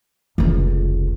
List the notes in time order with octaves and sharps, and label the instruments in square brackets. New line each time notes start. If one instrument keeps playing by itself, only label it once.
[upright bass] F1 C#2